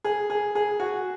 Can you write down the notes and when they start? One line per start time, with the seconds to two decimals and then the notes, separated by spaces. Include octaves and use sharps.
0.04 G#4
0.30 G#4
0.55 G#4
0.80 F#4